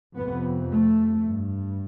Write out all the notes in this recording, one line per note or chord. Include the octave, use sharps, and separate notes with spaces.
F2 C3 B3
A3
G2